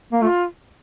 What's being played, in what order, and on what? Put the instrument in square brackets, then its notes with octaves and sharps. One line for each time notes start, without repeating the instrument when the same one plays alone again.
[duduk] A#3
[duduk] A3 [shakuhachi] F4